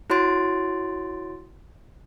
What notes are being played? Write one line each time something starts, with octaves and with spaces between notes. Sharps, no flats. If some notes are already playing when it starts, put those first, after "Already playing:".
E4 F#4 C#5 C6 A6 D7